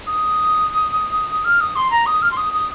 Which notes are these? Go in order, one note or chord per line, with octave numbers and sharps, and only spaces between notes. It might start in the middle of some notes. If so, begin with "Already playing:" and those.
D#6
F6
D#6
C6
A#5
D#6
F6
C6
D#6
D#6